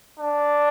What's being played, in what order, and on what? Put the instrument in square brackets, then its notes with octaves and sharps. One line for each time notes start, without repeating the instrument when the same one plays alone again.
[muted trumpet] D4